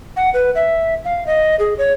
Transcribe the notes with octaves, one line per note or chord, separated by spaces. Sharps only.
F#5
B4
E5
F5
D#5
G#4
C#5